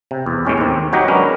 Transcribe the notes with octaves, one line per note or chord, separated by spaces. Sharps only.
C3
E2
A2 G#3 C#4 G4
D#2 C4
F#3 D#4 F#4 G4 D#5
G#3 C#4 D4 A#4 B4